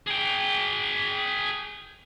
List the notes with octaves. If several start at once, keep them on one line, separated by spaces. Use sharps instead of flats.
G#4 G5